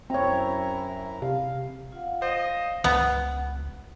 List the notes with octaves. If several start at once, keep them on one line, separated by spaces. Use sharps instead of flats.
F#2 C4 E4 C#5 A#5
C3 F5
F4 F5 F#5
C5 D5 D#5 F5
C#2 B3